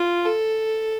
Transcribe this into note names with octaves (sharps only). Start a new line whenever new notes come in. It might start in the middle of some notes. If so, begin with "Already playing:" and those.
Already playing: F4
A4